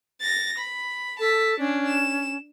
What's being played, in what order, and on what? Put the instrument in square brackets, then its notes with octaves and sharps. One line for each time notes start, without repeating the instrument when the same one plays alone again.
[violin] A6 A#6
B5
[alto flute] A4 [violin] A5 B6
[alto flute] C#4 [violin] D4
[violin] E7